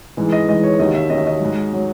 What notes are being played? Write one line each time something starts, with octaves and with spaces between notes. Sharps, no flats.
G#2 E3 G#3
D#5
G#2 E3 G#3 D#5
C#5
D#2 D#3 F#3 D#5
E5
D#2 D#3 F#3 D#5
E5
D#5
G#2 F#3
F#3